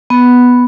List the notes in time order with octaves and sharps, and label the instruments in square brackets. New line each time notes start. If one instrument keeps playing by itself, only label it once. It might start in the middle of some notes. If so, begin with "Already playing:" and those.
[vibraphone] B3